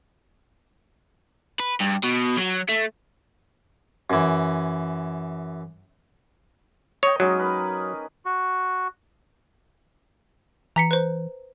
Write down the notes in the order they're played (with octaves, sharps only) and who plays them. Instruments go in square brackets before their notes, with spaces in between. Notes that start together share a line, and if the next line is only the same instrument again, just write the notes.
[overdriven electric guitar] B4
G2
B2
F#3
A3
[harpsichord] F#2 E3
[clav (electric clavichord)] C#5 [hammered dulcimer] D#5 G5
[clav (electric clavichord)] F#3 [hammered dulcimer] G#3 C#4 D#4
[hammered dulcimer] A#4 B4
[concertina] F#4
[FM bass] E3 [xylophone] A#5 B6 C#7
[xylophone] B4 C5